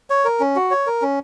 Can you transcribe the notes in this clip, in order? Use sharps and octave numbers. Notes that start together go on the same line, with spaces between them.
C#5
A#4
C#4
F#4
C#5
A#4
C#4